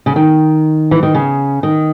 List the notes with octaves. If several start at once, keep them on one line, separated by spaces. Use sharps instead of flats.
C#3
D#3
E3
D#3
C#3
D#3